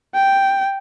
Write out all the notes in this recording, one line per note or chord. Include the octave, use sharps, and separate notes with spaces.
G5